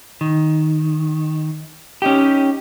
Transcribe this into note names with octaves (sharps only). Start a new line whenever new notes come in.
D#3
C#4 D#4 G4